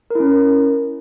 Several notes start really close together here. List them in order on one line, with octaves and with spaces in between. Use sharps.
A#4 E4 C#4